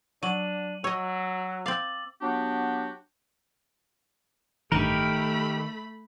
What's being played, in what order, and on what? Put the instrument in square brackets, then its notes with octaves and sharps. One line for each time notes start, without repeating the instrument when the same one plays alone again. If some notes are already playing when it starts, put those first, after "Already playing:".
[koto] F#3 [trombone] D4 [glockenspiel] D#7 F#7
[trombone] F#3 [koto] C#5 D#5 [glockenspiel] E6
[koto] C4 F5 [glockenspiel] D6 A6 F#7
[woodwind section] F#3 B3 D4 F#4 G4
[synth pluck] A1 G2 [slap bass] D#3 [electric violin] A3 B5 [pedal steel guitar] G4 A#4